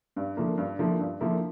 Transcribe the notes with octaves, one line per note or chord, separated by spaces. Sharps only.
G2
D3 F3 A#3 E4
G2
D3 F3 A#3 E4
G2
D3 F3 A#3 E4